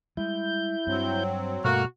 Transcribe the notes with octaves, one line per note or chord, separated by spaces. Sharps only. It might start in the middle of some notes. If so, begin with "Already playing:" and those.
G3 G#3 E4 G6
G2 F#3 C4
G2 B2 A3 A#3 F#4 F6